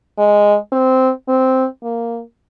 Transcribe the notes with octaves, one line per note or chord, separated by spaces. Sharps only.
G#3
C4
C4
A#3